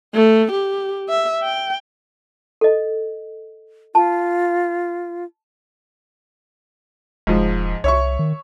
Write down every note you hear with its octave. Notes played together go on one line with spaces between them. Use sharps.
A3
G4
E5
G5
A4 D#5
F4 A5
E1 G#2 F3
C2 C#5 E5 C#6
D#3